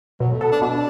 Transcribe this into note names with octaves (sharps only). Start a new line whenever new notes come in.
B2 F#3
A3
B3 A4
D4
B2 D4